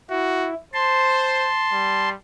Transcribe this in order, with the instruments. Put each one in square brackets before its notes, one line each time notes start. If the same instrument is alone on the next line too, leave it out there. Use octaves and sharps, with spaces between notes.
[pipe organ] E4 [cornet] F#4
[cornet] C5 [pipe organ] A5 C6
[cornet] G3